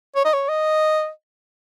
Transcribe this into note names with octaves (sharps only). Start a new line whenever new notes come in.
C#5
D#5
C#5
D#5